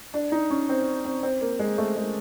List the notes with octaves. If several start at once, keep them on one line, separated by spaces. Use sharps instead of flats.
D4
D#4
C#4
C4
C4
C4
A#3
G#3
A3
G#3